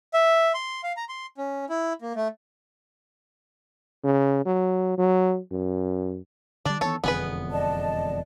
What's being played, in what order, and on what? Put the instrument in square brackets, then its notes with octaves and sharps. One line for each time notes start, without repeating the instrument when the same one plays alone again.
[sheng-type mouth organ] E5
C6
F5
A#5
C6
C#4
E4
A#3
A3
[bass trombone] C#3
F#3
F#3
F#2
[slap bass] D3 G3 [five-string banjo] D4 D5
[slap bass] D#3 E3 B3 [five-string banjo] A4 C#5
[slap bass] E1 F2 D3 [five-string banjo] B3 G#4 B4
[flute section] D5 D#5 A5